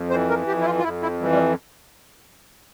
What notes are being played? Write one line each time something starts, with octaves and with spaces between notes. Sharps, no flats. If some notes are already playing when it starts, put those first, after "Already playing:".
Already playing: F2
E3 C5
A#4
F2 G4
E4
F4
F4
F2 E4
E4
E3 G3
G3